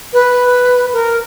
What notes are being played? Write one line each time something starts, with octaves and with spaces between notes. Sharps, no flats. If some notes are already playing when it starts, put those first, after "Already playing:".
B4
A#4